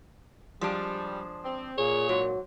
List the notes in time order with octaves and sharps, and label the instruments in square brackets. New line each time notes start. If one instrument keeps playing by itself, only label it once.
[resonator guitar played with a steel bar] F3 G#3 D4 [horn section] G3
[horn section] C4
[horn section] A#2 [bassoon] G#4 [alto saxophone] C#5
[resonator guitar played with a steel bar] G#2 [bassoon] F#3